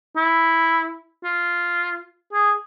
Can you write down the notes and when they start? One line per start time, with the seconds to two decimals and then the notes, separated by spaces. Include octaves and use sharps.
0.16 E4
1.24 F4
2.32 G#4